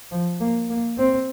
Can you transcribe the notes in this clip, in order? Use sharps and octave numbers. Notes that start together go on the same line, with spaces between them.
F3
A#3
A#3
C4